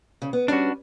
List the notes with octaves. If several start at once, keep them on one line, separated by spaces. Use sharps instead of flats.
C#3
B3
G3 B3 C#4 D4 F#4